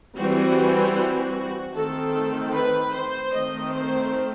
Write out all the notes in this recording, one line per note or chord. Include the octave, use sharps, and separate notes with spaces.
E3 G3 C4 F#4
F#4
D#3 A3 C4 A4
B4
C5
D#3 A3 C4 D#5
C5